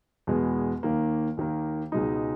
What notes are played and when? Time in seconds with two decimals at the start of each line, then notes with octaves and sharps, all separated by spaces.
0.27 E2 B2 G#3 B3
0.83 D#2 D#3 A#3
1.37 D#2 D#3 A#3
1.92 C#2 B2 G#3 D#4